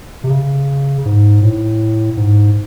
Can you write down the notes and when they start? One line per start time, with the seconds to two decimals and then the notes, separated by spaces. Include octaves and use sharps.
0.24 C3
0.30 C#3
1.06 G#2
1.42 A2
2.17 G#2